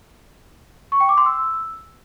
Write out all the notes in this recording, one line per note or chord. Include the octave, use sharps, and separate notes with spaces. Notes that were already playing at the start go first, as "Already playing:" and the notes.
C#6
G5
D6
C6
E6